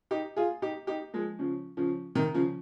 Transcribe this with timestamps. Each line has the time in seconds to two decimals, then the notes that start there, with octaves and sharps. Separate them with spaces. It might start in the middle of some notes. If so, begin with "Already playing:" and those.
0.11 D#4 G4
0.36 F4 G#4
0.62 D#4 G4
0.87 D#4 G4
1.13 F3 G#3
1.39 C#3 F3
1.77 C#3 F3
2.15 C3 D#3
2.34 C#3 F3